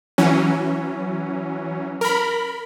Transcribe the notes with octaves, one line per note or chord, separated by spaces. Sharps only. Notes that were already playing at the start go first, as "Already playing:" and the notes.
E3 F#3 C#4
A#4 B5